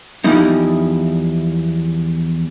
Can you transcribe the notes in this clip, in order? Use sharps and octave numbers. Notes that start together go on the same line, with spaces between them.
E2 F3 G3 D#4 E4